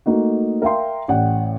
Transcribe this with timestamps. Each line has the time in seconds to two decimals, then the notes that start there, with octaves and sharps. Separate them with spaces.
0.06 A3 A#3 D#4 F#4
0.62 A#4 E5 F5 G5 C6
1.08 A1 D5 F#5 G5